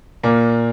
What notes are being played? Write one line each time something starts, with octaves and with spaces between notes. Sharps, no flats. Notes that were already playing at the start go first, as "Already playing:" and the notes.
A#2 A#3